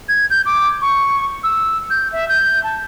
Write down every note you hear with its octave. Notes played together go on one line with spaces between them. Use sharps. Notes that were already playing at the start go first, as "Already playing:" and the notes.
G#6
G6
D6
C#6
E6
G6
E5
G6
A5